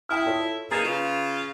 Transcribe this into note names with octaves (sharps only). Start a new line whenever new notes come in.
E4 G5 D#6 F6
F4 A4 C#5
A#3 D#4 G#4 B4 A6 E7
C#3 F4